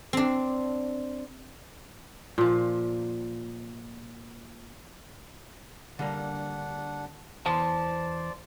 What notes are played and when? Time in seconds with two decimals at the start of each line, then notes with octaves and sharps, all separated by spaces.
0.13 C4 D4
2.38 A#2 F3
5.99 D3 G3 A#3 D4 F#5
7.46 E2 E3 C5 D5 A5 C6